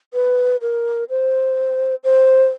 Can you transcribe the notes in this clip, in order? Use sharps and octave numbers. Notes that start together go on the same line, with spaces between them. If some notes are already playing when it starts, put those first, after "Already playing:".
B4
A#4
C5
C5